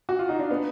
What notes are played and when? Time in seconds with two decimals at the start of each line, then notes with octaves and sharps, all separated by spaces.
0.09 F#4
0.19 F4
0.29 D#4
0.39 D4
0.51 B3